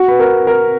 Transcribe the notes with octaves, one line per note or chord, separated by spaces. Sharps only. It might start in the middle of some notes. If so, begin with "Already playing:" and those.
Already playing: F#4
B4
A#4
A#4